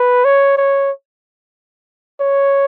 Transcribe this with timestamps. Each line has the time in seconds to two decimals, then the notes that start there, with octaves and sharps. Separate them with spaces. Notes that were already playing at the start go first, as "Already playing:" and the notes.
Already playing: B4
0.25 C#5
0.57 C#5
2.20 C#5